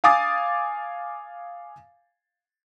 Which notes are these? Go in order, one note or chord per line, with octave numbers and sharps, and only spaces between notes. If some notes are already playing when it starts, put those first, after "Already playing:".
F5 G#5 D6 D#6 A6